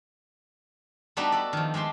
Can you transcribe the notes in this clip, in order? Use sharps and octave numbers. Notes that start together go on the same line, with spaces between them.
G3 A3 B3 D4 D#4 F#4
A4 D5
D#3 F3
G#3 A3 G4 C6